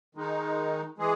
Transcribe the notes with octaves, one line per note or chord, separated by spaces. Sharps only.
D#3 G#3 D#4
E3 G#3 G#4